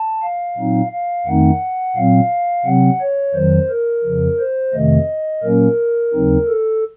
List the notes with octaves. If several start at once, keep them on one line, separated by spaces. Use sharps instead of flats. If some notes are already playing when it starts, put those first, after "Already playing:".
Already playing: A5
F5
A#2 F#3 C4 D#4
F5
F2 D#3 A3 C4 D#4 F#5
A#2 F#3 C4 F5
C3 F#3 C4 F#5
C#5
F2 D#3 F#3 C5
A#4
F2 C#3 F3
C5
F2 C3 D#3 A3 D#5
A#2 F#3 A#3 C#4 A#4
D#2 C#3 F#3 C4 D#4
A4